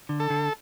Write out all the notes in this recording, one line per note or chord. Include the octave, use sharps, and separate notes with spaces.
D3
A4
D3